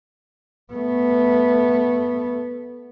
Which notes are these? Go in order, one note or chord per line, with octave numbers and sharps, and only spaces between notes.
A3 B3